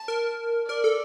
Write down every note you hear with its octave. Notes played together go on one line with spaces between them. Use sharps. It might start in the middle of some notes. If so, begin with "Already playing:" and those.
Already playing: A5
A#4
A#4 D5
A4